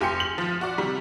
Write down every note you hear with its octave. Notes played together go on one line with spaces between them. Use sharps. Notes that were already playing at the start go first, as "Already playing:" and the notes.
F1 G4 G#5 C6 C#7
F#7
F3
F#4 D5
C3 G3